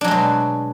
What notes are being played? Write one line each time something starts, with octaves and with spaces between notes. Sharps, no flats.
B2 F#3 G#3 D4